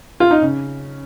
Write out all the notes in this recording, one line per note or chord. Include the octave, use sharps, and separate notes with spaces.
F4
D#4
C#3